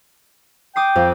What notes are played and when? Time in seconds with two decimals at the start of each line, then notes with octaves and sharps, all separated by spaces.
0.76 G5 D6 D#6 C7
0.96 F2